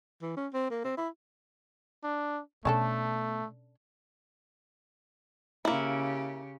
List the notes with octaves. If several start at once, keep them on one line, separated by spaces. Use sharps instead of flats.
E3
C#4
C4
A#3
C4
E4
D4
B2 A3 C#4 D4 A4
C#3 A#3 E4 G4